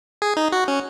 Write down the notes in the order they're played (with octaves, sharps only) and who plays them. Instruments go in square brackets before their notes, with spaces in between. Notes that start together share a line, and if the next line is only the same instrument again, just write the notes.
[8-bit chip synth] G#4
D#4
F#4
C#4